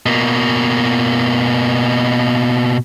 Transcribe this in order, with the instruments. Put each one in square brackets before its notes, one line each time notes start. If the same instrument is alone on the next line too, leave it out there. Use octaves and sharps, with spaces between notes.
[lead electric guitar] B2 A#3